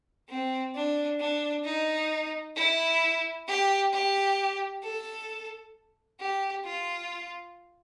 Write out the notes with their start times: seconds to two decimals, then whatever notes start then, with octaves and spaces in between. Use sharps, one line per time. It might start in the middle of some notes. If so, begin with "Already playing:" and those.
0.29 C4
0.75 D4
1.20 D4
1.65 D#4
2.56 E4
3.47 G4
3.93 G4
4.83 A4
6.20 G4
6.65 F4